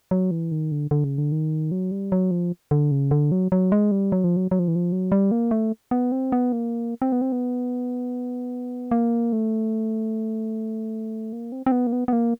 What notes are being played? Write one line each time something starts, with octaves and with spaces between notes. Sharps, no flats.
F#3
E3
D#3
D3
D3
C#3
D3
D#3
F#3
G3
F#3
F3
D3
C#3
D3
F#3
F#3
G#3
G3
F#3
F3
F#3
F#3
F3
E3
F3
F#3
G3
A#3
A3
B3
C4
B3
A#3
C4
B3
C4
B3
A#3
A3
A#3
C4
C4
B3
A#3
B3
B3
A#3